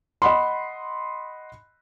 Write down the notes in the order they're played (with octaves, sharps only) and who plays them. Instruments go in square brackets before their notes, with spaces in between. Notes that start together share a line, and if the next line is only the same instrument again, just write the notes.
[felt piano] D#5 F#5 B5 C6